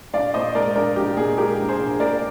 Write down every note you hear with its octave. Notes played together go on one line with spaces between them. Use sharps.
A#1 D5 F5
A#2 C5 D#5
G#3 A#4 D5
A#1 A#4 D5
A#1 G4
A#2 G#4
G#3 G4 A#4
A#1
G#4 C5
A#1
A#2 A#4 D5